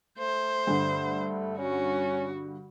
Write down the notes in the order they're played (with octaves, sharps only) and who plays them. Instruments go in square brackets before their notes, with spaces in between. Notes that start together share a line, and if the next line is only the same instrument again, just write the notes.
[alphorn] A3 [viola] C5
[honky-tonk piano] G2 D3
[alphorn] C#4 [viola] F#4